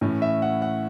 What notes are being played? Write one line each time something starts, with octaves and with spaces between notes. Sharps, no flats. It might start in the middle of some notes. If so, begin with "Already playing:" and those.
A2 E3 C#4 E4
E5
F#5
F#5